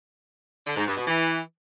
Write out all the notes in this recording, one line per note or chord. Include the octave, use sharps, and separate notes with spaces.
D3
G#2
G2
B2
E3